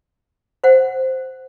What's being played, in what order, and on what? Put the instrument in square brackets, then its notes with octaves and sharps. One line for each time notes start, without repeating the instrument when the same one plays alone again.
[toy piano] C5 F#5